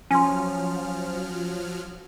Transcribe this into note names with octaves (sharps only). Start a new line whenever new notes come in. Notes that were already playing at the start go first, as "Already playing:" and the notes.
F3 F#3 C#4 G#5 C6 F6